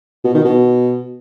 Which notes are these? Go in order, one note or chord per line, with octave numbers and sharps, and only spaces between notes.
B2
D#3
B2